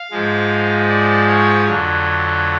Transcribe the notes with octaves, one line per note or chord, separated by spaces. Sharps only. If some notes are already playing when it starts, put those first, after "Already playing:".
Already playing: F5
G#2 F3 G#3
D5
C#5
F2 D3 F#3